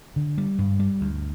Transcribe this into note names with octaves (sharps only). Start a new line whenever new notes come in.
D3
G3
G2
G3
D2